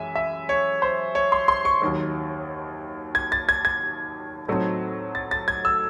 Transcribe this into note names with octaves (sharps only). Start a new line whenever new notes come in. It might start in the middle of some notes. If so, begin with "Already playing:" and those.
Already playing: F#2 E3 G#3 E5 G#5
E5
C#5
C5
C#5
C6
C6
C#6
D#2 D#3 F#3
G#6
A6
G#6
G#6
A2 F#3 A3 C4 D#4
A6
A6
G#6
E6